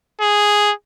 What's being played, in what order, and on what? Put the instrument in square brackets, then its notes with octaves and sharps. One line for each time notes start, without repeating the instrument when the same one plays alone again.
[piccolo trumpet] G#4